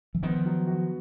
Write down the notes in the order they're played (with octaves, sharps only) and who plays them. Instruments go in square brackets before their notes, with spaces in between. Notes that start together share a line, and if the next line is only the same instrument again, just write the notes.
[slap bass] E3
[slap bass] D#3 F3 [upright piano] B3
[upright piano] F#3
F#4